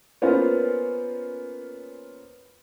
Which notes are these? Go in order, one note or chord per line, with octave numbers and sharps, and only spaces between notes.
A#3 B3 C#4 F4 C5